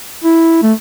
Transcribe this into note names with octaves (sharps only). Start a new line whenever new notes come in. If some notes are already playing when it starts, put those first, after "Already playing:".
E4
A3